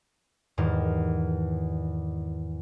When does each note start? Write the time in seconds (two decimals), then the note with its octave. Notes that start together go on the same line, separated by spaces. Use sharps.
0.58 E2 G#2 D#3 G3